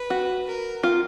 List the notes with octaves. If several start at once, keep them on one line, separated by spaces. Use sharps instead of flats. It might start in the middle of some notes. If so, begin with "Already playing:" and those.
Already playing: B4
F#4
A#4
F4